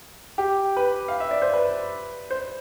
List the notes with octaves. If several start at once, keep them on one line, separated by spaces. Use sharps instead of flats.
G4
B4
F5
E5
D5
C5
B4
C5